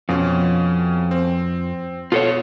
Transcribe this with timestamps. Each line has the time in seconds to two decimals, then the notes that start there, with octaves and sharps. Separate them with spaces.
0.09 F2 B2 C#4
1.11 C4
2.12 B2 F4 A4 C#5